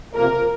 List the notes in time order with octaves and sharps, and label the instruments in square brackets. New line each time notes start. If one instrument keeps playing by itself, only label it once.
[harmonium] C3 F3 A#3 [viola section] A#4